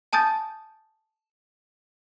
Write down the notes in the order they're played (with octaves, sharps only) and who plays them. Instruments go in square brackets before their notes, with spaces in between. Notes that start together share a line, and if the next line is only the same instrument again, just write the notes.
[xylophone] G#5 A5 D#6 G6 A6